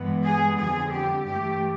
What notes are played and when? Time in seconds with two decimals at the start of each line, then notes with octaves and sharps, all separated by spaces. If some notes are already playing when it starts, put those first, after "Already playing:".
Already playing: G2 E3 G#3 B3
0.23 G#4
0.57 F2 D3 G3 G#4
0.90 G4
1.24 G2 E3 A3 G4